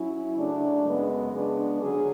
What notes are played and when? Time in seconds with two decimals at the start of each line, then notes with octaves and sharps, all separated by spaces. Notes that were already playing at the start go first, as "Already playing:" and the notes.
Already playing: F#3 C#4 E4
0.36 C#3 F#3 A3 D4
0.85 F#2 C#3 G#3 B3
1.33 C#3 G#3 B3 D4
1.82 D3 F#3 C#4 G#4